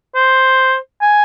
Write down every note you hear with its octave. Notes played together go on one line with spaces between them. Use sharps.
C5
G#5